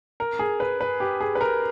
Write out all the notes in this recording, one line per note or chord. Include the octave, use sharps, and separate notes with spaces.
A#4
G#4
B4
B4
G4
G#4
B4
A#4